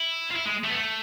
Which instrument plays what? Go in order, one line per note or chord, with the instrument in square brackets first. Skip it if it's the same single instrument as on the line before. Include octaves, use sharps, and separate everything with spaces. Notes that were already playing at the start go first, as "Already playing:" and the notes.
Already playing: [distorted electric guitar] E4
F4
E4
G#3
A3
B3
A3